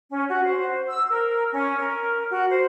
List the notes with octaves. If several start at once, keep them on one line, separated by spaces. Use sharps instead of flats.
C#4
F#4
C5
E6
A#4
C#4
A#4
F#4
C5